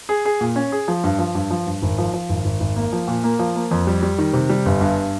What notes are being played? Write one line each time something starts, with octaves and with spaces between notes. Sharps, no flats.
G#4
G#4
A#2
C#4
G#4
F3
G2
F3
G2
F3
G2
G#1
F3
F3
G#1
G#1
G#1
A#3
F3
A#2
A#3
F3
A#3
F2
G3
G3
D#3
C3
G3
G1
G2